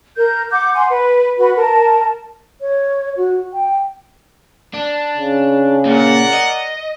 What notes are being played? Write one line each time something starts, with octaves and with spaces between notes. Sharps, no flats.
A#4 G6
F#5 D6 G6
F#5 G#5 C6
B4
F#4 B4 B5
A#4 A5
C#5
F#4
G5
D4
C#3
A#2 A#4 D5 F#5
D#5